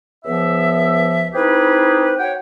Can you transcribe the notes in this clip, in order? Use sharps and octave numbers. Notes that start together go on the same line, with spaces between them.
C#2 F3 B3 E5
C4 D#4 E4 G4 G#4 B4
F#4 C#5 F#5 G5